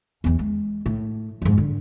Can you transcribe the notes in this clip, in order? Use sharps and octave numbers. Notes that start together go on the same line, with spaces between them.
E2 E3
G#3
A2
F2 G#2
D3